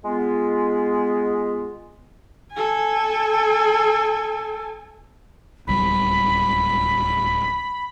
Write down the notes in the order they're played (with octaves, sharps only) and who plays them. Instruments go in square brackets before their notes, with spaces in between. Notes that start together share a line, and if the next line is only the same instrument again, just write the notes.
[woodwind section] G#3 B3 F4
[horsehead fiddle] A4 G#5
[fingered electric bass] D1 C#2 G3 [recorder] B5